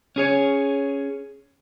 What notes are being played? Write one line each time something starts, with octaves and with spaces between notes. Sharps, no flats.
C#4 G#4 C#5